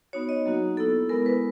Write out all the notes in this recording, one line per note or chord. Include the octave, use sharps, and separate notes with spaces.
B3 D#4 F#4 C#5
D#5
F#3 A#3 D#4 F#4
B3 E4 A4
G#3 B3 E4 A#4
B4